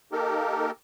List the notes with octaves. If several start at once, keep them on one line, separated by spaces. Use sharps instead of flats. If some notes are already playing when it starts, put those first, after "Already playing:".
A#3 D#4 G4 A4 A#4